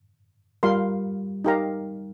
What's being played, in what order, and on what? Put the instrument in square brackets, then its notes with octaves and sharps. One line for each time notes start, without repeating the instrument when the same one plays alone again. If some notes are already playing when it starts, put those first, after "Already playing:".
[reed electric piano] G3 [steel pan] F4 A#4 F5 C6
[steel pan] D#4 G4 A#4 F5 A#5